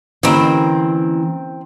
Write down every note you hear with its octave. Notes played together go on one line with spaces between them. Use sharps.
D3 E3 A#3 C4 C#4 A#4 C5